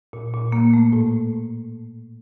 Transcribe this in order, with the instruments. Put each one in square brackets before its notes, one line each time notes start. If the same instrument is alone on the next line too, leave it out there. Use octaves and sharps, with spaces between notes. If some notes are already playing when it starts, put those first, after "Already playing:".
[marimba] A#2
A#2
A#3
A3
A2